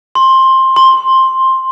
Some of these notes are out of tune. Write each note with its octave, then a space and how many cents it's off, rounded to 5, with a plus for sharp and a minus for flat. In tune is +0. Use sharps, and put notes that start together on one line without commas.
C6 +15
C6 +10